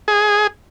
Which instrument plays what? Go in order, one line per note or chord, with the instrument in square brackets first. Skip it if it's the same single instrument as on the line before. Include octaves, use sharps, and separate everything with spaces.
[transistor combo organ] G#4